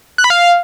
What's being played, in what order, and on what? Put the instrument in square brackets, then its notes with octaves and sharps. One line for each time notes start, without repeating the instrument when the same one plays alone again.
[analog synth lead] F#6
B5
F5